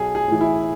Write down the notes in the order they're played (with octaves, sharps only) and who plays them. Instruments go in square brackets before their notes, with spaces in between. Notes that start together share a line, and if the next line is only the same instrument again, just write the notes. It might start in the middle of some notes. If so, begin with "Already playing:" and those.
Already playing: [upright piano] B1 G#4
G#4
A2 E3
E4